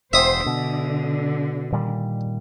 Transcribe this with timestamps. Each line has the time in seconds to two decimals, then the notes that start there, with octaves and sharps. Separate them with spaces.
0.13 E1 C5 E5 D#6
0.46 B2 D3
1.72 A#2 D#3 G3